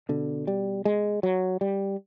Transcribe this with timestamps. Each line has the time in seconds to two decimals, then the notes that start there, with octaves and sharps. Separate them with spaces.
0.09 B2 D3
0.47 G3
0.85 G#3
1.23 F#3
1.61 G3